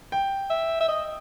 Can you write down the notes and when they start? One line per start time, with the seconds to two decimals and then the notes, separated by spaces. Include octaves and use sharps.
0.12 G5
0.50 E5
0.81 E5
0.88 D#5